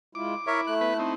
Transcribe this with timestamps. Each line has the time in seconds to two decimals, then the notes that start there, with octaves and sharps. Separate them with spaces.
0.15 G#3 E4 F4 D6
0.47 E4 A#4 C#5 E5
0.67 A3 F#6
0.81 B3 B4
0.99 C4 D#4